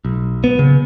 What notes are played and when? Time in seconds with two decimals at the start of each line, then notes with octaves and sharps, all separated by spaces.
0.05 B1
0.44 B3
0.59 C#3